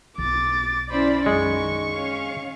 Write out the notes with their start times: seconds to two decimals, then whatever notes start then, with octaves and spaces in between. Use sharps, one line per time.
0.18 B1 F4 D6 A6
0.91 C#4 E4 C5 D5 B5
1.26 F#2 D#3 G#3 C#6
1.87 C#4 F5